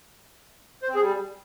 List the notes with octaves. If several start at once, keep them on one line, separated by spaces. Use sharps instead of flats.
C5
C4
G#4
G3